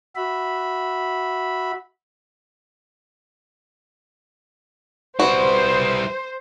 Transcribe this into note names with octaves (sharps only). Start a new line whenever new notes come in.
F#4 E5 B5
G3 E4 F#4 B4 C5